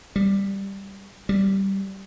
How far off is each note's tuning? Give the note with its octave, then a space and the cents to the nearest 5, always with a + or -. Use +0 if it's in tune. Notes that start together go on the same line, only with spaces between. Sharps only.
G3 +5
G3 -10